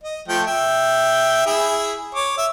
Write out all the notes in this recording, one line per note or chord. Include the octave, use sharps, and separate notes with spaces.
D#5
F3 A3 G5
E5 G5
E4 G#4 E5
C#5 D6
E5